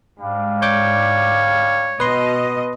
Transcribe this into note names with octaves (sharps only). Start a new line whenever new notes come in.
G#2 G3 D4 F5
C#5 D5 D6 G6
B2 B4 D#5 C6